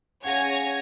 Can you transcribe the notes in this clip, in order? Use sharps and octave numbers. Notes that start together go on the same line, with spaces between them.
C#4 G#4 C#5 F5 F#5 G#5 A#6